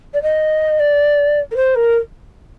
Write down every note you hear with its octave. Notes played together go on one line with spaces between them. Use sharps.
D5
D#5
D5
A#4
C5
A#4